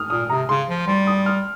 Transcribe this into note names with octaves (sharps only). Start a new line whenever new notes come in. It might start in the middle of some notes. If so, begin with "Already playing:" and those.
Already playing: D#6 F6
A#2 D#6
C3 A#5
C#3 C6
F3
G3 C6
D#6
F6